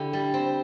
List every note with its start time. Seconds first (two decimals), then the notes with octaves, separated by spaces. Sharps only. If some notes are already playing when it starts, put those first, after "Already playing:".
Already playing: D3 E4 G4
0.13 G3
0.34 C4